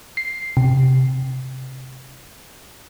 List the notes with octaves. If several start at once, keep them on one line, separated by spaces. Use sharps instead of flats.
C7
C3